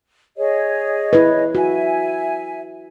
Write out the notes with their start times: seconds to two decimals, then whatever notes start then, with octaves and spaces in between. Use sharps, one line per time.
0.37 G#4 C#5 D#5
1.13 E4 B4
1.55 F#4 E5 G#5